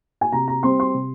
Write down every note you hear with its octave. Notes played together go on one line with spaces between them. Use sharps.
G#5
C3 A#5
A#5
G3 C4 C6
C6
C3